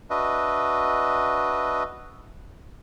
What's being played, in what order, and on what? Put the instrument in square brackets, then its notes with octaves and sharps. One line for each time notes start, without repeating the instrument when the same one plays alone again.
[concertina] D4 F#4 B4 D#5 E5